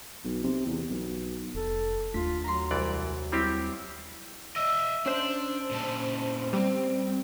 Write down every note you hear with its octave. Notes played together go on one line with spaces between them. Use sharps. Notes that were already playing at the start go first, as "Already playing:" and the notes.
B1
C3
E2
B1
F1 A4
D#2 A3 D4 F4 B6
F#3 A#5 C6
C2 E3 D5
G3 C4 E4 G4
D#5 E5 E6
C#4 D4 C5
A#2 G#3 A5
G3 C4 C5